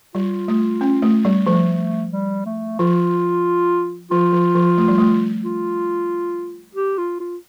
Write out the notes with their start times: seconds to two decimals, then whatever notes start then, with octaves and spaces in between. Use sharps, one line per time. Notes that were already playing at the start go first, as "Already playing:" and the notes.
0.15 G3 F4
0.48 A3
0.81 C#4
1.02 A3
1.25 G3
1.47 F3 A3
2.12 G3
2.46 A3
2.79 F3 F4
4.11 F3 F4
4.33 F3
4.55 F3
4.78 A3
4.88 G3
4.98 A3
5.44 F4
6.75 G4
6.98 F4
7.20 F4